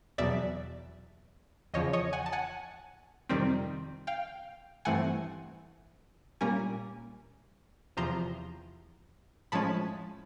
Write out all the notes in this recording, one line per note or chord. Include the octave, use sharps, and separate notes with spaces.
E2 B2 F#3 D5 E5
E2 C#3 F3 C#5 D#5
C#5 D#5
F#5 G#5
A5
F#5 G#5
F2 C3 D#3 G3 C4
F5 G5
G2 E3 A3 C4 F#5 G#5
A#2 G3 A#3 C#4 G#5 A#5
E2 C3 F3 A#5 C6
A2 F3 G#3 C#4 A5 B5